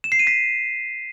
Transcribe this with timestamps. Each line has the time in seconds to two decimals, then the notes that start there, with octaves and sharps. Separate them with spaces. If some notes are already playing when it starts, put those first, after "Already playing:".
0.04 E7
0.12 C7
0.19 D#7
0.27 B6